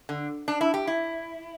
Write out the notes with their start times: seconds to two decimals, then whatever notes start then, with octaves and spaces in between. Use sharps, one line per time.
0.09 D3
0.48 D4
0.61 E4
0.74 G4
0.87 E4